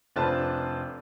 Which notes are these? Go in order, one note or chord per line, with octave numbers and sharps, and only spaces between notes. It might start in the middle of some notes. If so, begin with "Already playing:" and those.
F1 D4 F4 B4 C5 A5